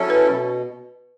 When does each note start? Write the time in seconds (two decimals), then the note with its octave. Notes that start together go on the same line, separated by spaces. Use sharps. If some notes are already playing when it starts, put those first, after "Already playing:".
Already playing: F#3 C#4 E4 A4
0.10 B4
0.27 B2